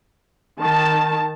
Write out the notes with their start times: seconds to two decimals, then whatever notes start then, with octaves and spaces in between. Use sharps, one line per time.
0.60 D#3 A5